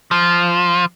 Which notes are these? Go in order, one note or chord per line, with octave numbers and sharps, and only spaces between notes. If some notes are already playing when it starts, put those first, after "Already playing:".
F3